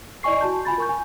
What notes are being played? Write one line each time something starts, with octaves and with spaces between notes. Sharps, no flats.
E4 D5 D#5 G#5 C#6 C7
F#4 A5 G6
F4 G#5 B5 A6
A#4 C#6 G6
G#5